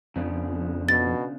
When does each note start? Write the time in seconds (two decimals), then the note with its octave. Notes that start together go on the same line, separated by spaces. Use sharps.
0.16 F2 C#3 B3 D4
0.89 B2 A6